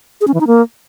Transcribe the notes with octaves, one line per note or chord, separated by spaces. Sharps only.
G#4
C#4
E3
D#4
A#3